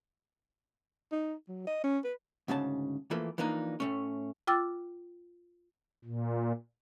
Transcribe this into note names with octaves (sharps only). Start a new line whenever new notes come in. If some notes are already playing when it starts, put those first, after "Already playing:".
D#4
F#3
D#5
C#4
B4
D2 G#2 C#3 C#4 A5
E3 F3 A3 A#3
E3 F3 A#3 D4 D#4
A2 A3 C#4
F4 G5 D6 E6 A6
A#2